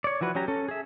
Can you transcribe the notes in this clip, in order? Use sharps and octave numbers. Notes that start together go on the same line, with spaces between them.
C#5 D5
E3 F3 F#4 B4
F#3 C#4 G4 A#5
C#4 A4
G#4 E5